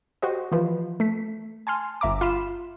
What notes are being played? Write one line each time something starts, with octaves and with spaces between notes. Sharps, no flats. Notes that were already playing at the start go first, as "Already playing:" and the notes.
F#4 G4 C5 D#5
E3 F3 B4
A3 B6
G#5 A5 C6 F6
G1 E5 A#5 D6
F4 B5 E7